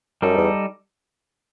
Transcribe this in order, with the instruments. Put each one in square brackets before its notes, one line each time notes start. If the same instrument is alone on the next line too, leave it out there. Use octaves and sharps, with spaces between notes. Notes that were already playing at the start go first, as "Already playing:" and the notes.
[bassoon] F#2 [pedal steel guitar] G3 D#4 A4
[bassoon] E2